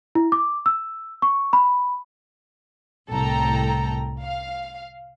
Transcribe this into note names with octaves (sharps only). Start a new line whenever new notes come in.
E4
D6
E6
C#6
B5
C2 A2 A4 G5 A#5
F5